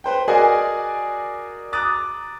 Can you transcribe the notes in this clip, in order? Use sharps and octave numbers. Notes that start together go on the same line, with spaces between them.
B4 C5 G5
F#4 G#4 A#4 D5 D#5 G#5
A#5 D6 D#6 F#6 A6